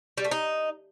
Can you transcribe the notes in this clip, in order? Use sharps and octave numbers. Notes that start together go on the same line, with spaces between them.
G3
A3
D#4